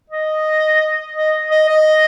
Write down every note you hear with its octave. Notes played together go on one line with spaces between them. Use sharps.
D#5
D#5
D#5
D#5